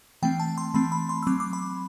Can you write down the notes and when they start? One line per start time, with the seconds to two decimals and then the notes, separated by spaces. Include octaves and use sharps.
0.22 E3 A3 C4 G5
0.40 A5
0.58 C6
0.74 E3 A3 C4 B5
0.92 B5
1.09 C6
1.23 E6
1.27 F#3 C4 D6
1.40 D6
1.53 B5